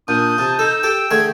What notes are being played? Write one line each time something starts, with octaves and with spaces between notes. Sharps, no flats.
A#2 D4 D#6 G6
C3 A5
D#4 A4 E6
G4 A4 G5
D3 A3 G#4 G#6